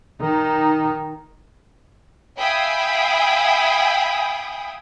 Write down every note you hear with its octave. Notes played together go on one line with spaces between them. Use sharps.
D#3 D#4
E5 F5 G5 G#5 B5 D#6